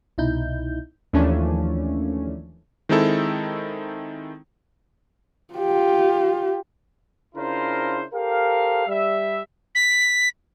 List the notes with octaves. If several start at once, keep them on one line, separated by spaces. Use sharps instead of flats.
C2 B2 D#4 E4 G6
D#2 E3 F3 A3 C#4 D4
D#3 G#3 C4 D#4 E4 A4
F4 G4
C#3 D4 E4 F4 A#4 C5
G4 A4 A#4 C5 F5
G3 E5
B6